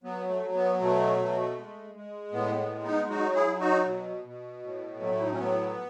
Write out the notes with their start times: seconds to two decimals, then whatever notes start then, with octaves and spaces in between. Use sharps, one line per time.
0.04 F#3 B3
0.29 A3
0.42 F#3
0.54 B3
0.80 B2 A3
1.19 B2
1.57 G#3
1.95 G#3
2.32 A2 B3
2.58 B3
2.71 G#3
2.83 B3 D#4
3.09 F#3 D#4 F#4
3.34 E4 G#4
3.47 F#3
3.60 D#4 F#4
3.86 B2
4.24 B2
4.63 A2
5.00 F#3 A3
5.15 E4
5.23 D#4
5.31 C#4
5.38 A2 B3